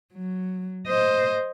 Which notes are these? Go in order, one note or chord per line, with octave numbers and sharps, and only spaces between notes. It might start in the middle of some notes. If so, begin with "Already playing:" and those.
F#3
C5 D#5